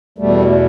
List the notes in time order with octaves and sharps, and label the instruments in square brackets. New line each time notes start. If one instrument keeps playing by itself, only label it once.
[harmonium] E2 B2 G3 A3